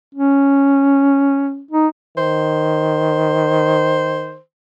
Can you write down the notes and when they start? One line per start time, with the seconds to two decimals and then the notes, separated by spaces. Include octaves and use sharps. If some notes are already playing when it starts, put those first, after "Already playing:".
0.15 C#4
1.71 D#4
2.18 D#3 C5